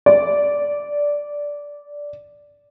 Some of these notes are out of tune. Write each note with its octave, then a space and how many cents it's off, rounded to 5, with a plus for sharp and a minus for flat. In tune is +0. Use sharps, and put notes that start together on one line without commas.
D5 -10